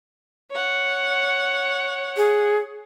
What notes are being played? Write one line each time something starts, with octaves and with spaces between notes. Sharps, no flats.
C#5 F#5
G#4